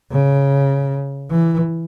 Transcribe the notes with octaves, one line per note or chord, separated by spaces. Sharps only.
C#3
E3